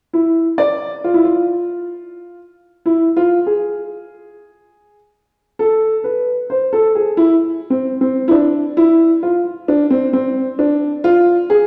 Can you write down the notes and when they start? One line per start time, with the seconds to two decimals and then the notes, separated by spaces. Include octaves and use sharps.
0.13 E4
0.58 D5
1.04 F4
1.14 E4
1.24 F4
2.86 E4
3.17 F4
3.46 G#4
5.59 A4
6.04 B4
6.50 C5
6.73 A4
6.95 G#4
7.17 E4
7.70 C4
8.01 C4
8.28 E4
8.31 D4
8.77 E4
9.23 F4
9.68 D4
9.90 C4
10.13 C4
10.59 D4
11.04 F4
11.50 G#4